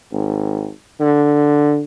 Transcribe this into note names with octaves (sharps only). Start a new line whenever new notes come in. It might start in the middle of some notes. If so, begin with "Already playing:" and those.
G#1
D3